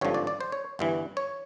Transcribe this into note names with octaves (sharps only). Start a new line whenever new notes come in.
G#1 G2 D3 F3 C#5
D5
D5
C5
C#5
G1 G2 E3
C#5